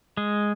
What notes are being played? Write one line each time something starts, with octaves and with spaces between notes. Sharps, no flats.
G#3